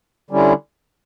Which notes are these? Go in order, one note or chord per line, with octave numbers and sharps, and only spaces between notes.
D3 G3 C#4 E4